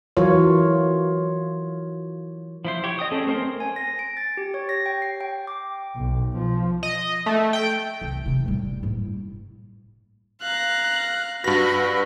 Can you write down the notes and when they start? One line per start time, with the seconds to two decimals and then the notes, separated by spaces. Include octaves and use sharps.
0.17 E3 F#3 F4 A#4 C#5
2.65 F3 E4 C5
2.84 G4 C#5
2.99 D#5 G5 D#6
3.11 C#4 G#4 A4
3.26 A3 C4 A#4 C5 G5
3.60 G#5
3.76 A#6
3.99 D7
4.17 A6
4.37 G4
4.54 C#5
4.69 A#6
4.86 G5
5.02 C7
5.21 G5
5.47 D6
5.96 B1
6.37 F3
6.83 D#5
7.26 A3
7.53 G5
8.02 C2
8.26 C3 E4
8.46 A2 G3
8.83 A2 A#3
10.42 F5 A#5 F#6
11.44 G2 F#4 B4 B5 A#6